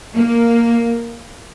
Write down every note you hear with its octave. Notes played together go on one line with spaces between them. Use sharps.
A#3